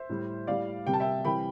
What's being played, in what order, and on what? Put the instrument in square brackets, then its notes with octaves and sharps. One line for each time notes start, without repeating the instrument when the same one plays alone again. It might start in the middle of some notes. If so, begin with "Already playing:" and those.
Already playing: [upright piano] C5 E5
A2 G3
A2 G3 D5 F5
C3 G3 G5
A5
E5 G5
C3 E3 G3 G5 B5